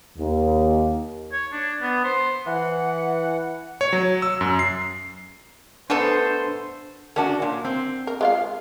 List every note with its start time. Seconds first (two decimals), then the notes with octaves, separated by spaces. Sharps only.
0.18 D#2
1.32 C#5
1.52 D4
1.81 B3
2.04 C5
2.47 E3 F#5
3.81 C#5
3.93 F#3
4.22 E6
4.41 F#2
4.59 C7
5.90 A3 B3 D4 A4 C5
7.16 C#4 D4 F#4 A#4 A5
7.42 A#2
7.64 C4
8.07 A#4
8.21 G#3 F4 F5